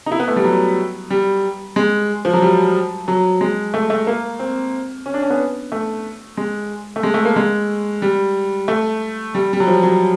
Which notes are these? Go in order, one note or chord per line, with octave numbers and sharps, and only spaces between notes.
D#4
E4
B3
A3
G3
F#3
G3
G#3
F3
F#3
G3
F#3
G#3
A3
A3
A#3
C4
C#4
D4
C#4
B3
A3
G#3
A3
G#3
A3
A#3
G#3
G3
A3
G3
G3
F#3
F3
F#3